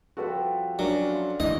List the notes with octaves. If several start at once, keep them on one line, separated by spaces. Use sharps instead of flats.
F3 G3 C4 F#4 A4 B4
F#3 C#4 D4 A#4
E4 F4 A4
D2 G#2 E3 A3 D#5